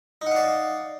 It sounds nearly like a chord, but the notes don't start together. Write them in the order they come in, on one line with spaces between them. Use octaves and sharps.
D#4 F#5 F5 D5